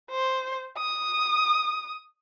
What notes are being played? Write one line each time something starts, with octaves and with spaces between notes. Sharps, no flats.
C5
D#6